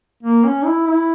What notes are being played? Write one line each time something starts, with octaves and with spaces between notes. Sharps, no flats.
A#3
C#4
E4
E4